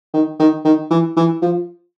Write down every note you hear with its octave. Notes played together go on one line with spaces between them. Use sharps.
D#3
D#3
D#3
E3
E3
F3